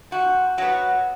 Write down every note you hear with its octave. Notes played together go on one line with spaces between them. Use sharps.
C3 F#4
F#3 B3 F#4